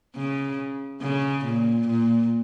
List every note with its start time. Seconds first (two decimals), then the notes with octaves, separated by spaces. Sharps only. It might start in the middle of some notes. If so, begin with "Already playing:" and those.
0.16 C#3
1.02 C#3
1.45 A#2
1.88 A#2